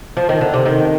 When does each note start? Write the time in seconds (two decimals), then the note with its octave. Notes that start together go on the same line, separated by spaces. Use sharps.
0.17 F3
0.29 D#3
0.41 D3
0.54 C3
0.66 D#3